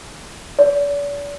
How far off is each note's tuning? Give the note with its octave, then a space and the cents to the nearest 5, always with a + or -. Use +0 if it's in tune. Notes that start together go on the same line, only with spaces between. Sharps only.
D5 -45